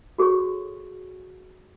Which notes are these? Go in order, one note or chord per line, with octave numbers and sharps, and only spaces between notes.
F#4 G#4 A4 C#5 C#6